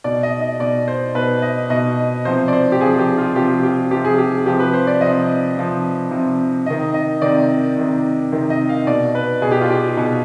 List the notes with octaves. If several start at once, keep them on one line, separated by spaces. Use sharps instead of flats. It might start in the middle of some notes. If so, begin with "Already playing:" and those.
B2 D5
D#5
D#5
B2 D5
C5
B2 B4
D#5
B2 D#5
C3 F3 C5
D5
C5
G4
C3 F3 G#4
G4
F4
C3 F3 G4
G4
C3 F3 G4
G#4
G4
C3 F3 G4
B4
C5
D5
C3 F3 D#5
C3 F3
C3 F3
C3 D#3 D#5
D#5
C3 D#3 D5
C3 D#3
C3 D#3
D#5
F5
B2 D5
B4
B2 G#4
G4
F4
G4
B2 G#4